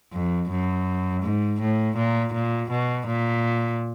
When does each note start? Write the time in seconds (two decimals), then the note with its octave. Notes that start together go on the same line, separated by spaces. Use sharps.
0.13 F2
0.50 F#2
1.23 G#2
1.61 A2
1.96 A#2
2.33 A#2
2.70 B2
3.07 A#2